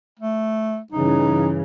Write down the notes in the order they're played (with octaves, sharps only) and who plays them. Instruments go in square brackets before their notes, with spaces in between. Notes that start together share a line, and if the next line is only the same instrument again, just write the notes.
[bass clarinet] A3
[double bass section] G2 C#3 E3 [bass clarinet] D#4